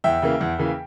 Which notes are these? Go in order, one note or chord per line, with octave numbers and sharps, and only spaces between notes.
E2 E5 G5
C#3 E3 A#3
E2
C#3 E3 A#3